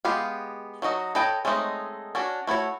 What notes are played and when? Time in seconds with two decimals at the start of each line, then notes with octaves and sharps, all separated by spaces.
0.05 G#3 B3 G4 B4 F5
0.82 F#3 D#4 F#4 D#5
1.15 A4 B4 C#5 D#5 G5
1.45 G#3 A3 C4 C#4 D#4
2.15 C#4 D4 F#4
2.47 A3 E4 F#4 C#5